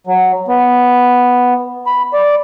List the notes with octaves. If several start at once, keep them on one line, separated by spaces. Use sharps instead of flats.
F#3
B3
B5
D5